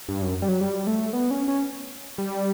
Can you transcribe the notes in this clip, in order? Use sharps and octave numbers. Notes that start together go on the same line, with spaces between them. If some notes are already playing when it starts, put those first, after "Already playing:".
G2
F#2
G3
F#3
G3
A3
B3
C#4
C#4
G3